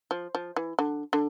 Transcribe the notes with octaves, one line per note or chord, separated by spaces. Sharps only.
F3
F3
E3
D3
D3